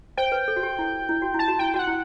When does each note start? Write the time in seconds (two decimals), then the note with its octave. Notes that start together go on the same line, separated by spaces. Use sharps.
0.17 C5 G5
0.32 B4
0.48 A4
0.56 F#4
0.63 G4
0.79 E4
1.09 E4
1.22 F#4
1.34 E4 A5
1.48 F#4
1.59 E4 G5
1.74 F#4 G5
1.79 F#5
1.87 E4